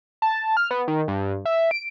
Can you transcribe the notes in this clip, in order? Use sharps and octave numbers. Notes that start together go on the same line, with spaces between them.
A5
F6
B3
D#3
G2
E5
D7